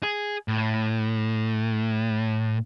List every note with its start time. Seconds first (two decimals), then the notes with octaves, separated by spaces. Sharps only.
0.03 G#4
0.48 A2